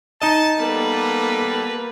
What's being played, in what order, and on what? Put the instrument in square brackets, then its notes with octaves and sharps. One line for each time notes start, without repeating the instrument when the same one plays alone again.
[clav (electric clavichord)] D#4 D#5 [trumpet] A5
[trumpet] G3 [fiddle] A#3 B4 [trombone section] B3 A4